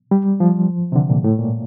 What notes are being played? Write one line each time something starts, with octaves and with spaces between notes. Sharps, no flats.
G3
F3
C3
D3
A#2
A2
A#2